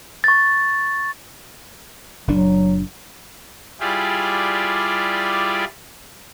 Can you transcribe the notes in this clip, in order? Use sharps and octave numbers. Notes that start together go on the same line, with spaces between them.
C#6 A6
F#1 A#2 F#3 D4
G3 E4 F4 G4 G#4 D5